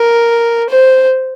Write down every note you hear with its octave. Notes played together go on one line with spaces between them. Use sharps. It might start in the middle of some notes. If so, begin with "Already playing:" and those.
Already playing: A#4
C5